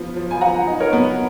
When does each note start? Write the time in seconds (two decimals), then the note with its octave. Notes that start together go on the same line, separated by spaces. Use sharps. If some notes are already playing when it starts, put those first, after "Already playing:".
Already playing: F3 B3
0.16 F3
0.31 G#5
0.41 F3 F#5 A#5
0.67 D#4
0.80 A#4 C#5
0.93 B3